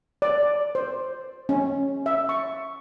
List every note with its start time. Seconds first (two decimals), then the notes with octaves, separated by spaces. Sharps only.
0.22 D5
0.75 C5
1.49 C#4
2.06 E5
2.29 C#6